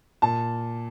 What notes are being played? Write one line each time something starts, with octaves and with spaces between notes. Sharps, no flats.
A#2 A5